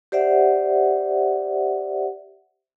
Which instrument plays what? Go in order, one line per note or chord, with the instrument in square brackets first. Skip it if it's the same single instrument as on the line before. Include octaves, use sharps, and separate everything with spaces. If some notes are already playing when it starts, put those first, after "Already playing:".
[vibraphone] G4 C5 D5 E5 F#5